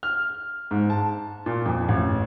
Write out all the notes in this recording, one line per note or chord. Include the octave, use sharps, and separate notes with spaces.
F6
G#2
A5
A#2
F2
A1